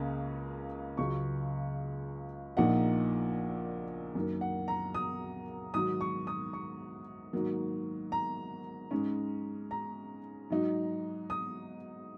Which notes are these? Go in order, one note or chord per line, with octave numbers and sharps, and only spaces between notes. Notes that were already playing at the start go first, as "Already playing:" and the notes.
Already playing: C#2 C#3 A#3 C#4
C#2 C#3 F#3 C#6
A#1 A#2 A#3 D#4 F#5
F#2 D#3 A#3
F#5
A#5
D#6
G#2 D#3 F#3 D#6
C#6
D#6
C#6
G#2 D#3 F#3 A#3
A#5
G#2 G#3 C#4
A#5
G#2 F#3 D#4
D#6